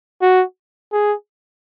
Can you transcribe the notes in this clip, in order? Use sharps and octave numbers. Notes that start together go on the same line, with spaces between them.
F#4
G#4